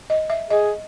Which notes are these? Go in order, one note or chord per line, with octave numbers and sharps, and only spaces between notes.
D#5
E5
G#4 D#5